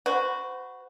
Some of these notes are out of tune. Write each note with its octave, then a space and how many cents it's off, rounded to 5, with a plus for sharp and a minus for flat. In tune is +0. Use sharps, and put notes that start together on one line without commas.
F#4 +0 C5 -35 B5 +0